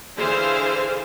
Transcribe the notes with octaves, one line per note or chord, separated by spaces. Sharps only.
D3 E3 E4 G#4 C5 F5